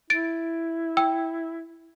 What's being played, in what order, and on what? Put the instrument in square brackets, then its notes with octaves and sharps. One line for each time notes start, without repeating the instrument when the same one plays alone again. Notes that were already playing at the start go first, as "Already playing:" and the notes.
[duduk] E4 [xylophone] A6 D7
[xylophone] G5 E6